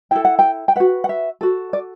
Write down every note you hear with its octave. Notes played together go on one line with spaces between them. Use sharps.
E4 A4 G5
F#5
G5
G5
F#4 B4 F#5
F#5
E5
F#4 A4
D5